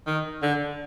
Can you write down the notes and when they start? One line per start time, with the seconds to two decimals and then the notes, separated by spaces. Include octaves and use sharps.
0.07 D#3
0.42 D3